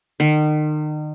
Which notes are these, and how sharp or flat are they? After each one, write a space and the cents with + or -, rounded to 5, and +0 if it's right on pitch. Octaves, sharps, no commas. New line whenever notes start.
D#3 -35